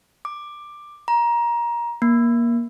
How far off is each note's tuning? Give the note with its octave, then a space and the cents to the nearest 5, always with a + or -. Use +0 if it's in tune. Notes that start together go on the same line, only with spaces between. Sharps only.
D6 +10
A#5 +20
A#3 +20